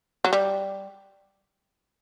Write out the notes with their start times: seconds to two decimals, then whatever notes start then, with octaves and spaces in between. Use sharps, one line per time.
0.25 F#3
0.33 G3